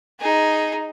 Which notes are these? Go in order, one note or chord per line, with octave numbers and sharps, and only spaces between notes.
D#4 G#4